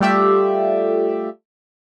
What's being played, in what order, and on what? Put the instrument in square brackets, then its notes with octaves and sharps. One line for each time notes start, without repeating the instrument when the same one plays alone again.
[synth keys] G3 A3 F4 G4 D5 E5